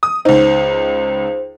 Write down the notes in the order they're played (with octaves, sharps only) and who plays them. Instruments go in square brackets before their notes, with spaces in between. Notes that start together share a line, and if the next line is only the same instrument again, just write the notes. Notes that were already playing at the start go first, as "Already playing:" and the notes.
[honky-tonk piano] D#6
[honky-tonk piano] C#2 D#4 [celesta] C5